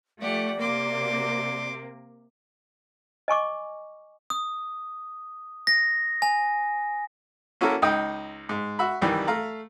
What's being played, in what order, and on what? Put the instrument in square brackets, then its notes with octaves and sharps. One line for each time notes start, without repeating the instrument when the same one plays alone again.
[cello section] F3 A3 [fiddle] G4 F#5 [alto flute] D5
[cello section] C3 A#3 [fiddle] C6 D6
[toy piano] D#5 G#5 C#6 D6
[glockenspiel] D#6
A#6
G#5
[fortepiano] A#3 C#4 E4 F#4 A4 A#4
C#2 D#4 D#5 G5 D#6
G#2
F#4 E5 B5
C2 D#3 E3 G3
A3 F5 A#5